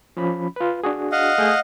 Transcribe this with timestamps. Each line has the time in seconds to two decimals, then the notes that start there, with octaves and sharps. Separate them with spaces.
0.17 F3 C#4 B5
0.56 F4 B4
0.84 D4 F#4 G#4
1.12 D#5 F5 F#5
1.38 A3 G#4 G6